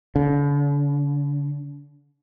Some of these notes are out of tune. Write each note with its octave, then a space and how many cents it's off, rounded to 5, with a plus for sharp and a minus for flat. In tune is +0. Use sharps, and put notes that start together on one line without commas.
D3 -40